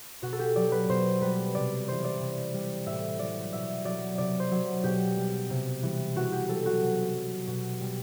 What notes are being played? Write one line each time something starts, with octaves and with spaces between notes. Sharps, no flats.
B2 F#4
A4
G4
F#3 D5
B4
B2 C5
G3 B4
C3 D5
E3 G3 C5
D5
C3
G3
A2 E5
F#3 D5
B2 E5
F#3 D5
C3 D5
C5
F#3
B2 G4
G3
C3
E3 G3
B2 F#4
G4
F#3 A4
F#4
C3
F#3
B2
G3